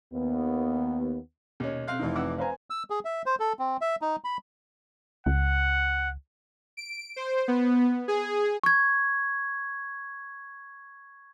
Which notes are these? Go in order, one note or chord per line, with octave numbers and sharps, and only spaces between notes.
D#2 B3
D#2 B2 C#4
C4 F5 F#6
F1 E3 D#4
F2 F#5 D6 E6
B4 C5 F5 G#5 A#5
E6
G#4
E5
C5
A4
C4
E5
D#4
B5
C#2 F#5
D7
C5
B3
G#4
C#6 G#6